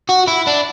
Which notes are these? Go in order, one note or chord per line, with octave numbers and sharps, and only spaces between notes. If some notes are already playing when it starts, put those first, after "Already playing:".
F#4
E4
D4